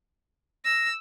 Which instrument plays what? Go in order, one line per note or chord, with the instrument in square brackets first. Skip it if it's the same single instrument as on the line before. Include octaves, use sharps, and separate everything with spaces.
[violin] E6 [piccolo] A#6